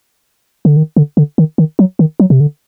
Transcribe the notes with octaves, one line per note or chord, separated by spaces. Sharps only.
D3
D#3
D3
D3
D#3
D#3
F#3
D#3
F#3
C3
D3